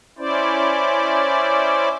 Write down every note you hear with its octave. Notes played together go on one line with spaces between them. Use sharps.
C#4 E4 C5 D5